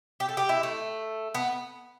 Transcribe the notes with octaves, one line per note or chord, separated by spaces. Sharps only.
G4
A4
G4
E4
A3
B3